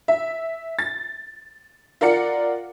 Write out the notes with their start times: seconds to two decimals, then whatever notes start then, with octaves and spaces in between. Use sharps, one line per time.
0.08 E5
0.79 A6
2.01 F4 A#4 D5 F#5 C#7